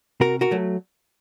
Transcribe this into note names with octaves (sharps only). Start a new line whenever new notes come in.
C3 F#4 A#4
F#4 A#4
F#3 A3